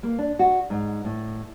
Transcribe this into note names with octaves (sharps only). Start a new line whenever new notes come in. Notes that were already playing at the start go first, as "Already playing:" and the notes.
A#3
D4
F#4
G#2
A2